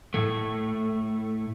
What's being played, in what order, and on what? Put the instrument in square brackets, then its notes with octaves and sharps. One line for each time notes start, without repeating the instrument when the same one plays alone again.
[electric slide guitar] A2 A3